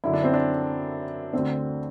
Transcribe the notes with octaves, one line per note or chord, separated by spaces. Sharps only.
F#2 D3 E4
D4
C4
D4
D2 D3 C4